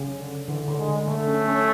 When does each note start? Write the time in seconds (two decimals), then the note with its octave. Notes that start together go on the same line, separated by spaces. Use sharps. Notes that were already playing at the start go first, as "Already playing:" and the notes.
Already playing: C#3
0.19 D3
0.48 D3 E3
0.68 D3
0.78 G#3
0.88 D3
1.07 D3 A3
1.28 C#4
1.48 C#4